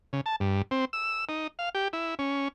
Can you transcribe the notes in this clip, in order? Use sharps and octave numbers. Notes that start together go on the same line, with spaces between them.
C#3
A5
G2
C4
E6
D#4
F5
G4
E4
C#4